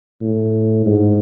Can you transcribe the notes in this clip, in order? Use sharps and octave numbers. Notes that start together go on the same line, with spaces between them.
A2
G#2